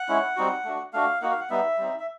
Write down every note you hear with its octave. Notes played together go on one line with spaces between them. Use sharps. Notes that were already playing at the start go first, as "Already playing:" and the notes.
Already playing: F#5
G#3 C#4 E4
G3 C4 D#4 F#4
A3 D4 F#4
A3 D4 F#4 F5
A#3 D#4 F#4 F#5
F5
F#5
G3 B3 D#4 E5
G3 C4 D#4
E5